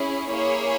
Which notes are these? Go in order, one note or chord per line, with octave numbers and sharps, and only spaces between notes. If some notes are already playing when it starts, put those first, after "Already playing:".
Already playing: C#4 E4 G#4
A#3 E4 G#4 C#5